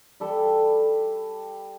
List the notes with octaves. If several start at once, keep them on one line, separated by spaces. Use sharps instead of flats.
G3 A4 B4 G5